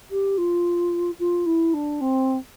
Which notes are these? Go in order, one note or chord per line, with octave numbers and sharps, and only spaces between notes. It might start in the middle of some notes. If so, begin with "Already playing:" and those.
G4
F4
F4
E4
D4
C4